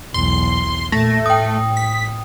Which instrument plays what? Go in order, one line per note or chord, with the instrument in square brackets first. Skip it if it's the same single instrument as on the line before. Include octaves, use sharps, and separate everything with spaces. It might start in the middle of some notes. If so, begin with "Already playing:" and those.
[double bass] B1 E2 [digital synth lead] C6
[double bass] A#2 [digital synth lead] A3 [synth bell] A#6
[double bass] A2 [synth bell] G5 D#6
[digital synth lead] B6